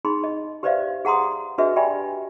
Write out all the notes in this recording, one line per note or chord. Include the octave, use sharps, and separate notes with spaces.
D#4 G#4 B5 C6
D#5
G4 B4 C5 D5 E5 F5
G#4 F#5 A#5 C6 D#6
D4 F#4 G#4 B4 D#5 E5
G4 D5 E5 G5 G#5 B5